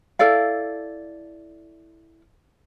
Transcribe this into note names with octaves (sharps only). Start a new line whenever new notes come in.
E4 A4 D5 F5